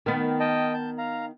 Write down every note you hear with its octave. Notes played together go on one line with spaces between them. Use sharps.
D#3 B3
D#5 G5 A5
A5 G6
F5 A#5